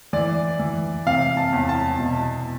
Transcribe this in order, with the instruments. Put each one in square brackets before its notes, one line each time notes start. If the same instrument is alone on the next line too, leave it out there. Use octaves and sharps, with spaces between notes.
[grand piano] E3 D5
E3
C3 F5
A5
E2
A5
B2